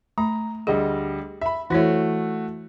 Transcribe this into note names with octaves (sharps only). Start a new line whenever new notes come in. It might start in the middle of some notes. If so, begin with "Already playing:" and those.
A3 A#5 B5
D2 G3 G#4 D#5
E5 B5
E3 A3 E4 F#4 C#5